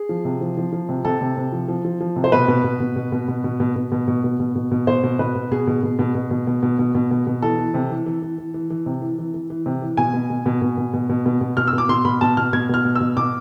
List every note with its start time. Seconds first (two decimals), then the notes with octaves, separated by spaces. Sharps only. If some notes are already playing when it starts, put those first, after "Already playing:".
Already playing: G#4
0.09 F3
0.25 C3
0.41 F3
0.57 F3
0.73 F3
0.89 C3
1.05 C3 A4
1.21 C3
1.37 C3
1.52 F3
1.68 F3
1.85 F3
2.01 F3
2.16 C3
2.24 C5
2.32 B2 B4
2.48 B2
2.64 B2
2.80 B2
2.96 B2
3.12 B2
3.28 B2
3.44 B2
3.60 B2
3.76 B2
3.92 B2
4.08 B2
4.24 B2
4.40 B2
4.55 B2
4.71 B2
4.87 B2 C5
5.03 B2
5.19 B2 B4
5.35 B2
5.51 B2 G#4
5.67 B2
5.83 B2
5.99 B2
6.15 B2
6.31 B2
6.47 B2
6.63 B2
6.79 B2
6.95 B2
7.11 B2
7.27 B2
7.42 E3 A4
7.59 E3
7.74 C3
7.90 E3
8.06 E3
8.22 E3
8.38 E3
8.54 E3
8.70 E3
8.86 C3
9.02 E3
9.19 E3
9.34 E3
9.50 E3
9.66 C3
9.82 E3
9.97 B2 G#5
10.14 B2
10.30 B2
10.46 B2
10.62 B2
10.78 B2
10.94 B2
11.09 B2
11.26 B2
11.41 B2
11.57 B2 F6
11.67 E6
11.73 B2
11.78 D6
11.89 B2 C6
12.05 B2 B5
12.21 B2 A5
12.37 B2 F6
12.53 B2 G#6
12.69 B2 F6
12.85 B2
12.95 E6
13.01 B2
13.17 B2 D6